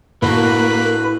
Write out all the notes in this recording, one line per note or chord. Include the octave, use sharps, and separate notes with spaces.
A2 E3 A#3 D4 F#4 B4 F#6